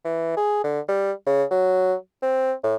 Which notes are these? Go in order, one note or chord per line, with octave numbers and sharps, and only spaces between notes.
E3
G#4
D3
G3
C#3
F#3
C4
A2